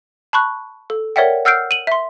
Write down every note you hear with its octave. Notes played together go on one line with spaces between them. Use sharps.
A5 B5 C#6 F#6
A4
A#4 C#5 D5 E5 F#5 G5
F#5 E6 F6 G6 C7 D7
D#7 F#7
E5 C6